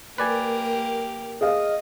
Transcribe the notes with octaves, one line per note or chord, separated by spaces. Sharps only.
A#3 G4 A#4 B4 D5 G#5
G#4 D#5 F5